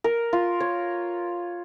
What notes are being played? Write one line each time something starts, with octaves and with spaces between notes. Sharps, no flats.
A#4
F4
C#5